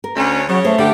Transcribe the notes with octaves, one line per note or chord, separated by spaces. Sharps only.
A#4
D2 C#4
C#3 F#3 C#5
A3 C5
D3 G3 G4